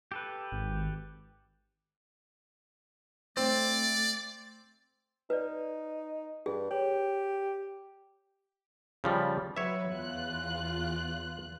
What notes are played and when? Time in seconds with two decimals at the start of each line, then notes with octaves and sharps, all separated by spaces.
0.12 G4 A4 B4
0.52 G#1
3.37 A3 C4 D5
5.30 D#4 B4 D5
6.46 G2 G#4
6.71 G4 C#5
9.04 C#3 F3 G3
9.56 F#3 B4 C#5 E5
9.90 E2 F4 F#6